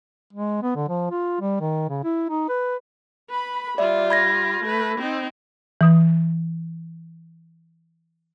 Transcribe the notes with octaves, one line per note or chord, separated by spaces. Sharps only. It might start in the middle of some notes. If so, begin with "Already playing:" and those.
G#3
B3
D3
F3
F4
G3
D#3
C#3
E4
D#4
B4
B4 B5
G3 F4 D5 E5
B5 G#6 A#6
A3 B4
C4 D#4
E3 D#6